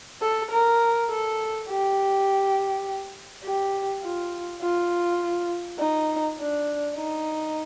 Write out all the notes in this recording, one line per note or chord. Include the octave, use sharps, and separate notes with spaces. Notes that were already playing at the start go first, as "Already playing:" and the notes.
A4
A#4
A4
G4
G4
F4
F4
D#4
D4
D#4